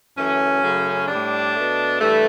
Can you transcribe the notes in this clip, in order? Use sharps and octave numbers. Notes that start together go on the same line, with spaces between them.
F#2 E3 A3 C#4
F#2 C#3 F#3 A3
A2 G3 D4
B2 A3
G2 E3 G3 A3